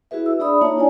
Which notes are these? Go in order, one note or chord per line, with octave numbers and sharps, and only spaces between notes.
E4 F#4 G#4 B4 E5
E5 E6
D4 G#4 D5 E5 B5 D#6
A#3 D#4 F4 C#5 A5 A#5
D4 E4 C#5 D5 G#5